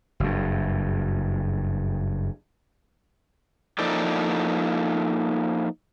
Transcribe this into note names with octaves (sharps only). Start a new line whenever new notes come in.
F#1 G2
F3 A#3 D#4 E4 A4 D5